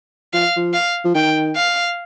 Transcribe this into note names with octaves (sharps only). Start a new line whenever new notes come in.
F3 F5
F3
F5
F3
D#3 G5
F5